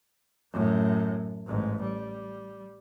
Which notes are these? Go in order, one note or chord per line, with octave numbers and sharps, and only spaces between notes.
F#2 A2
A1 G#2
G3